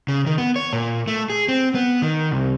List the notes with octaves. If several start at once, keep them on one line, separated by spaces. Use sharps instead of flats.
C#3
D#3
B3
C#5
A#2
A3
G#4
C4
B3
D#3
C2